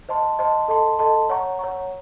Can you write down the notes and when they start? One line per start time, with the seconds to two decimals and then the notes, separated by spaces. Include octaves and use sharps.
0.09 C5 D#5 A5 C6
0.39 C5 D#5 A5 C6
0.68 A4 D#5 A5 C6
0.99 A4 D#5 A5 C6
1.29 C#5 F#5 A#5 C#6
1.59 C#5 F#5 A#5 C#6